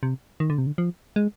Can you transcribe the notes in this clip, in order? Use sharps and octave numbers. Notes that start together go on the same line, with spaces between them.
C3
D#3
D3
C3
D3
F3
G#3